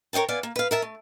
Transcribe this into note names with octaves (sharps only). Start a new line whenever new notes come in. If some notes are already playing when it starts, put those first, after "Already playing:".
A#4 C#5 D#5 G5 A5
B3 D5 F5 G#5
A#3
B4 F5
A#4 E5 A5
A3